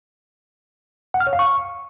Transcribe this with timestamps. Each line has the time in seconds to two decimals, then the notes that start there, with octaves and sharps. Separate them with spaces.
1.14 F#5
1.20 F6
1.27 C#5
1.33 F5
1.39 C#6